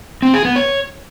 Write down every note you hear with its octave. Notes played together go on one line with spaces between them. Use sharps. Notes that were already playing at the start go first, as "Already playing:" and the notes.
C4
G#4
B3
C#5